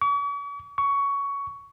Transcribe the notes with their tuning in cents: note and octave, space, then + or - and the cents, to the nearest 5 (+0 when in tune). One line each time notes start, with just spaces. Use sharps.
C#6 +45
C#6 +15